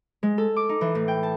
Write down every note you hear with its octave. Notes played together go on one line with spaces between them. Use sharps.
G#3
A4
D6
D#4
E3
A2
G5
A5